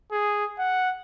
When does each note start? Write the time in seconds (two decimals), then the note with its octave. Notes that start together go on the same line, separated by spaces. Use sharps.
0.12 G#4
0.59 F#5